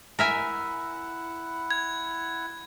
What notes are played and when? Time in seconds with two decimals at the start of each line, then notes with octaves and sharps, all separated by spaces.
0.19 E4 A#4 E5 F#5 G#5
1.71 G#6